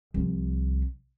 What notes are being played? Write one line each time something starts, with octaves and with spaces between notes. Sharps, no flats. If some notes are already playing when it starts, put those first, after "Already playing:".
C2 F3